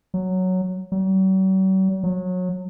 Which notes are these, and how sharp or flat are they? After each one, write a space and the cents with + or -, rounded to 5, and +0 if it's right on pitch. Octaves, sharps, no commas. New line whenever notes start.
F#3 +0
F#3 +45
F#3 -25